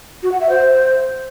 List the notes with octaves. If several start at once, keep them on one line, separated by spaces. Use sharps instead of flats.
F#4
F#5
E5
C5